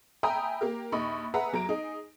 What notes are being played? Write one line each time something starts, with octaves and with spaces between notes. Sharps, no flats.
E5 G5 G#5 A#5 B5 D#6
A#3 G4 A#4
A#1 D#2 D#4 B5 C#6
G#4 B4 E5 F#5 A#5
E2 F#3 A#5 D7
D#4 G#4